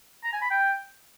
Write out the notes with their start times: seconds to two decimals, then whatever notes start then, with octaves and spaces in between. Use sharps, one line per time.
0.24 A#5
0.33 G#5
0.42 B5
0.51 G5